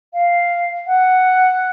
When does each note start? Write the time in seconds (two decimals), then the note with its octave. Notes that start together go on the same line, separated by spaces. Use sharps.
0.14 F5
0.87 F#5